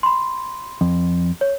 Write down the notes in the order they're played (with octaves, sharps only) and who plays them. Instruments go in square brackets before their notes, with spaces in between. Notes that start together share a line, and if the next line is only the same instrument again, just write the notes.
[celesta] B5 C6
[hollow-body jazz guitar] F2
[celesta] C#5